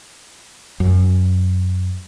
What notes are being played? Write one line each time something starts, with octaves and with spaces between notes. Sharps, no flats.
F#2